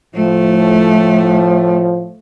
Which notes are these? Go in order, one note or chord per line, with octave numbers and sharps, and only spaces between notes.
A2 F3 A3